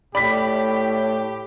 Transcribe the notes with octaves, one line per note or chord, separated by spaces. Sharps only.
A2 G4 D5 B5 B6